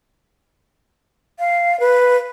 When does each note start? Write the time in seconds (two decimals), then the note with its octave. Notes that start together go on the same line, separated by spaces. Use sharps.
1.39 F5
1.80 B4